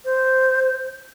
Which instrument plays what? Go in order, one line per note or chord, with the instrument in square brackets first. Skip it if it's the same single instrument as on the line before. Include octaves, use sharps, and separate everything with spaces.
[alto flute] C5